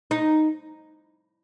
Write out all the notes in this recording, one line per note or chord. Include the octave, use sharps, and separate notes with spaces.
D#4